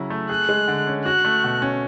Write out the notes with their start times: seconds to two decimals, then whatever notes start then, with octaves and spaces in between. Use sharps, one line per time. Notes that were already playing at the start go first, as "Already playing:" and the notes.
Already playing: C#3 F#3 C#4 E4
0.10 A3
0.29 G#4 F#6
0.49 G#3
0.68 D3
0.87 C#4
1.05 F#4 F#6
1.25 A3
1.44 B2
1.62 C#4